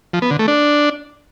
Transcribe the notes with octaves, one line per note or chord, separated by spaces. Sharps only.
F3
B3
D3
A3
D4